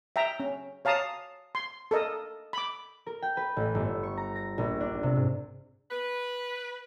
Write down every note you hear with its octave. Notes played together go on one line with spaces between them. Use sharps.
E5 G5 A#5
C#4
C#5 F5 A5 A#5 D#6
C6
A4 A#4 D#5
B5 D6
A#4
G5
B4
A1
G1
C#6
A#5
A#6
A#1
D4
C3
G#2
B4